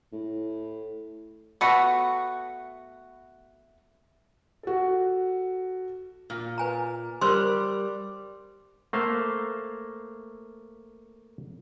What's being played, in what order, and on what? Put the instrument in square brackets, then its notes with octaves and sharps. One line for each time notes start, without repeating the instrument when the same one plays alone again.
[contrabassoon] A2
[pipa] A3 B3 F#4
[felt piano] F#4 A4
[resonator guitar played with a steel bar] A#2
[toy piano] B4 G#5 A#5
[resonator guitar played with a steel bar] G3 [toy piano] A#4 C5 C6
[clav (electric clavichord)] A3 A#3 C5 F5